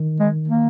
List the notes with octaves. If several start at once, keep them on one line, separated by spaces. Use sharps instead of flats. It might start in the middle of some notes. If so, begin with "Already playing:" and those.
Already playing: D#3
G#3
A#3